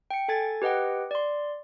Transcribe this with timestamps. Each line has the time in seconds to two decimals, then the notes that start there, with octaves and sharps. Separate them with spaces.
0.11 G5 C#7
0.28 A4 G#5 G#6 A6
0.62 G4 B4 D#5 F#5 G5
1.11 D5 C6